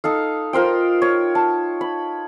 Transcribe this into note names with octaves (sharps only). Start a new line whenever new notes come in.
D#4 A4 F5
F4 A#4 C5 G5
C#5
A5
B5